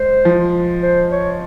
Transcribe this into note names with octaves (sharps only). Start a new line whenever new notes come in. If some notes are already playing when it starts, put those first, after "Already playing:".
Already playing: G#3 C5
F3
C5
C#5